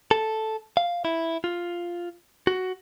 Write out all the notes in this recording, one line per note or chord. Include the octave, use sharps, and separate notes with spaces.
A4
F5
E4
F4
F#4